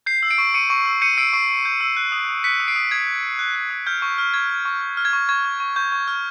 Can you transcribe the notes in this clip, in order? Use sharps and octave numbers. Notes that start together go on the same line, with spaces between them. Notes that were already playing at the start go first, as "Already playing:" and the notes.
G6 C7
E6
C7 D7
C#6
C#6 C#7 D#7
C#6
E6
G6 C#7 D#7
E6 C7 D7
C#6 C7
C#6
G6
E6
F#6
D#6
D#6
F#6 B6 C#7
D#6
C7 D7
D#6
D#6 G#6
F#6
F#6
F#6
F#6
D#6
F6 G6
C#6
F6
C#6 G#6
F6
C#6
F6
F6
G#6
C#6
C#6 G#6
C#6
C#6
C#6 G6
C#6
F6